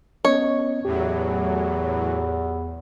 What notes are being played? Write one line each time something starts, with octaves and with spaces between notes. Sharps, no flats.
B3 C#4 C#5 D#5
E2 A2 E3 F#3 G4